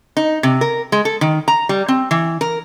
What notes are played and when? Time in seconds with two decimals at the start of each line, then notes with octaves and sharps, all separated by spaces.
0.17 D#4
0.43 C3
0.61 A#4
0.92 G#3
1.05 A4
1.21 D#3
1.48 A#5
1.69 G3
1.88 C4
2.11 E3
2.41 A#4